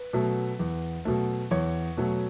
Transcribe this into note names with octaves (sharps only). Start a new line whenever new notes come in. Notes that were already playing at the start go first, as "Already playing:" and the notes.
Already playing: B4
B2 F#3 A3
E2
B2 F#3 A3
E2 C#5
B2 F#3 A3